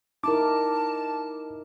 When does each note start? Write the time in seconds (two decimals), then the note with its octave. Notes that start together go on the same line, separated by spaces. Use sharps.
0.24 D#4 E4 A#4 A5 D6